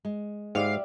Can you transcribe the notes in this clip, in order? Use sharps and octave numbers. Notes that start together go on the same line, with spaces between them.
G#3
G#2 G4 D5 E5 F5